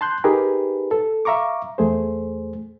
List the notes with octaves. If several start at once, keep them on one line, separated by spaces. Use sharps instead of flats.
A5 C6 F#6 G6
D#4 G4 G#4 A#4 B4
A4
E5 F5 A#5 C#6 D6
E2 A3 G#4 C5